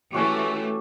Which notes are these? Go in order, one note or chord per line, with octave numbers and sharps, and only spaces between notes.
E3 A3 C#4 F#4 G4